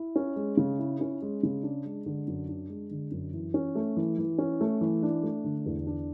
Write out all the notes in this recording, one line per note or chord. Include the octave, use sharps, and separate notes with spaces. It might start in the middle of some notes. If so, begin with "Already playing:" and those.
Already playing: E4
C#4
G#3
C#3
E4
C#4
G#3
C#3
D4
G#3
D3
F#2
D4
G#3
D3
F#2
E3
C#4
A3
E3
E3
C#4
A3
E3
D4
A3
D3
E2
D4